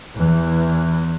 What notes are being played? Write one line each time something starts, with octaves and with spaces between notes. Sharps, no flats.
E2 E3